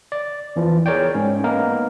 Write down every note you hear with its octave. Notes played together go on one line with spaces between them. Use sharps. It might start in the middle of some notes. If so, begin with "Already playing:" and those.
D5
E2 E3 F3
G#4 A#4 C#5 D5 G5
G#2 C#4
A#3 B3 D#4 A#4 B4